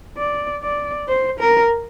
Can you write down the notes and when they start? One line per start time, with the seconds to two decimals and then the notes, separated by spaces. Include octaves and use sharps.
0.18 D5
0.63 D5
1.08 C5
1.39 A#4